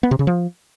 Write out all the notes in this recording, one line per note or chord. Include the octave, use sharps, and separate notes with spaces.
B3
C3
C#3
F3